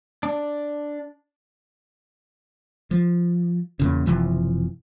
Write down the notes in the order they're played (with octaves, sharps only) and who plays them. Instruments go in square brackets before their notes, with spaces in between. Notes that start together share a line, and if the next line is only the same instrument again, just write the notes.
[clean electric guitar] D4
[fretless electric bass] F3
E2 A#2 C#3
F#1 C3 E3 F3